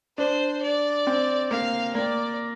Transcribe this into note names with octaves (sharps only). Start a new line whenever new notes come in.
D4 C5
D5
C4
A#3 F5
A#3 D5